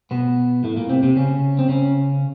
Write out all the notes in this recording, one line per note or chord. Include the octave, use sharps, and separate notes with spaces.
B2 B3
A2 A3
A#2 A#3
C3 C4
C3 C4
C#3 C#4
C4
C#3 C#4